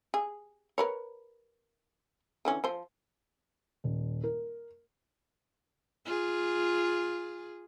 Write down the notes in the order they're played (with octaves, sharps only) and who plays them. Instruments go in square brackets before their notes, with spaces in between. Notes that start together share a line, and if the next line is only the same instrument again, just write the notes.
[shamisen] G#4
A#4 B4 C#5
D3 E3 C#4
F3 C5
[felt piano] D#1
A#4
[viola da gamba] F4 G#4